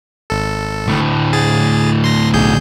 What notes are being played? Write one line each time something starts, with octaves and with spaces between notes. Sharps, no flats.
G#1 A4
D2 A2
G#4 A6
C6 A#6
B1 G#4 G6